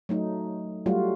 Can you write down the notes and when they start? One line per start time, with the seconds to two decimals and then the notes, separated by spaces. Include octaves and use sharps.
0.09 F#3 A3 D#4
0.86 F#3 G3 A3 F4 F#4